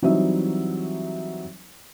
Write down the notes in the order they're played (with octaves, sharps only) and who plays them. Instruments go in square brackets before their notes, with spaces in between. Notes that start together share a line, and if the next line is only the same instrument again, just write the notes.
[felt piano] E3 F#3 G3 C4 D#4 E5